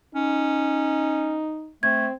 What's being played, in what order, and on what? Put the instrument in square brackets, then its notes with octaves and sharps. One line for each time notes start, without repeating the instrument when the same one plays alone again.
[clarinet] C#4 [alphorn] D#4
[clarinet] A3 [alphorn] C4 [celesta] G#6